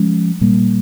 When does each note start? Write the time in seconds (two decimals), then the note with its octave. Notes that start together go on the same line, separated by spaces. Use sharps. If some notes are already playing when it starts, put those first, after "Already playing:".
Already playing: F3 G#3 C#4
0.41 A#2 G3 A#3